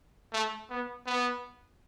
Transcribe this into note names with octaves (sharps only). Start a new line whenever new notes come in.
A3
B3
B3